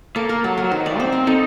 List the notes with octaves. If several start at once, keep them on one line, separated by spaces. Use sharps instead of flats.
A#3 A4
A#4
F#3 A4
A#4
F#3
D#3 C5
D5
C4 C5
A#4
D#4 A4